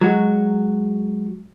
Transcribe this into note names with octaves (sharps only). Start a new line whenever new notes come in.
F#3 G#3 F#4